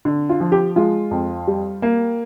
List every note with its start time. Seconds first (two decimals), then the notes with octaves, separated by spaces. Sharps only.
0.05 D3
0.29 F4
0.40 F3
0.52 G4
0.76 G#3 F4
1.11 F2
1.47 G3
1.82 A#3